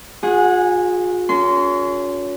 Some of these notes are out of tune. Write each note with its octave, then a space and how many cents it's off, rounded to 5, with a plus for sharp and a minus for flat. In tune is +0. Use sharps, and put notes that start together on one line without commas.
F4 +45 G#4 -10 F#5 -20
C#4 +30 A#4 +0 C6 -20